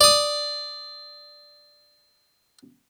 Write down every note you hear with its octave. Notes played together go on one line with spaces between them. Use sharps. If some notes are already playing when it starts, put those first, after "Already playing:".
D5 D#6